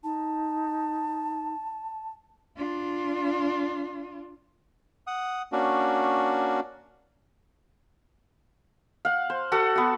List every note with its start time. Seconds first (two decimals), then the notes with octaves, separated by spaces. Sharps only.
0.04 D#4 A5
2.57 D4 F4
5.07 F#5 D#6
5.52 A#3 C#4 D4 F#4
9.05 F5 F#5
9.30 C5
9.52 F#4 A4 F#5
9.75 B3 F#4